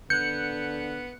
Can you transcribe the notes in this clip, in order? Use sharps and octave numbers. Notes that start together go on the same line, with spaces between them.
D3 B3 F#6 G6 C#7